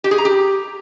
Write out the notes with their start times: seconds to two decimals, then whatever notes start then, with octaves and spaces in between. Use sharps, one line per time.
0.04 G4
0.11 G#4
0.18 A#5
0.25 G4